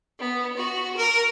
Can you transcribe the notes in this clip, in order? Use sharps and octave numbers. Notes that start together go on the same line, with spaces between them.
B3
F#4
A#4